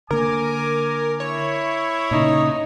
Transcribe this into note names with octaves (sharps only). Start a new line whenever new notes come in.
D3 A#3 A#4 G#5 D6
E4 C#5
A#2 C#3 D#4